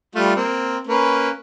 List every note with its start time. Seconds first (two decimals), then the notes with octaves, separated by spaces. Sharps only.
0.15 G3 A3 F4
0.36 A#3 C4
0.87 A#3 C#4 B4